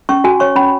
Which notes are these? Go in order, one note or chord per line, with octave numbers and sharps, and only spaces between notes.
C#4 C#6
F#4 G#5
C#5 C#6
C#4 B5